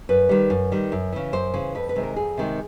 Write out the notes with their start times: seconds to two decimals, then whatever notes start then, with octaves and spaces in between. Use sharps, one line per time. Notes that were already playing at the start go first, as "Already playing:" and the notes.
0.09 F#2 B4
0.29 D#3 G3
0.50 F#2
0.72 D#3 G3
0.92 F#2
1.13 C#3 E3
1.33 F#2 C5
1.54 C#3 E3
1.75 F2 B4
1.89 B4
1.96 C3 D#3 G#3
2.03 A#4
2.16 F2 G#4
2.37 C3 D#3 G#3